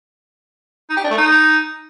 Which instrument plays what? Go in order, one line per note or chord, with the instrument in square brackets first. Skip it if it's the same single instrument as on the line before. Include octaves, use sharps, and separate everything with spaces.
[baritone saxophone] D#4
G4
D4
A3
D#4